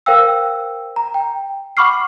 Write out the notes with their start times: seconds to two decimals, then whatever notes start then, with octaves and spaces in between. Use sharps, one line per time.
0.06 A#4 C5 F5 G5 E6
0.96 A#5
1.14 G5
1.77 F#5 B5 C#6 D6 F6 C7